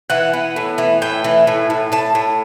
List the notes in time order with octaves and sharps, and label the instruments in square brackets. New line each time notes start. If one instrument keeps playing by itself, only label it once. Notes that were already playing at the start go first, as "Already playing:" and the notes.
[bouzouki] E3 F#5
B3
A2
E3
A2 G5
E3
A2
A2
A2 A5
A2